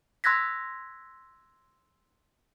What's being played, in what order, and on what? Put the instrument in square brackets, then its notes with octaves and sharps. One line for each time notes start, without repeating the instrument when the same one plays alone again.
[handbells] C6 E6 F#6 G#6 A#6 B6